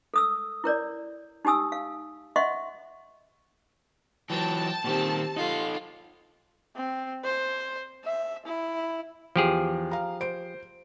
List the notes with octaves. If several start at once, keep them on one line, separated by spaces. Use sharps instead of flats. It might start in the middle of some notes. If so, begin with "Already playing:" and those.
A4 D#6 E6
E4 A#4 C#5 D5
D#4 G4 G#5 D#6 E6
F5
D#5 E5 F#5 C6 C#6
E3 F#3 G5 A5
A#2 D#3 C4 G4
D#4 F4 A4
C4
C5
E5
E4
E2 F3 G4 G#4
F5 A#5
C5 D7